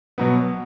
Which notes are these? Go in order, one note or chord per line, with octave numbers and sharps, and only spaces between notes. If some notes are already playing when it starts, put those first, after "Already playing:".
B2 F#3 B3